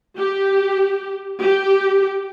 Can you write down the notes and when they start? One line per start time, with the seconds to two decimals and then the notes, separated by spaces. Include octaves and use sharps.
0.18 G4
1.43 G4